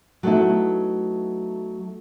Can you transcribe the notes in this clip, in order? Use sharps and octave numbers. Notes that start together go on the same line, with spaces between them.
F#3 A3 B3 D#4 E4